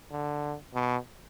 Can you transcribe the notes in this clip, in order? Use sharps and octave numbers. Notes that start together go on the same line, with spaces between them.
D3
B2